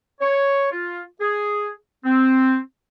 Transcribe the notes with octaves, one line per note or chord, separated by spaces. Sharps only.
C#5
F4
G#4
C4